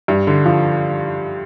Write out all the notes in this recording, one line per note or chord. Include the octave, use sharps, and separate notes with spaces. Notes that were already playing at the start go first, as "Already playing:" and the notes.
G2
D3
F3